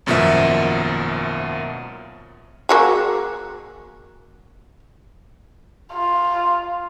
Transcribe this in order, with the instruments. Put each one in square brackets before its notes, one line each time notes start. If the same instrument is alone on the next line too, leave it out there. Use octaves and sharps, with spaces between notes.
[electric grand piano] G#1 F#2 B2 F3 A#3 E5
[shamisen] A#3 F#4 G#4
[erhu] F4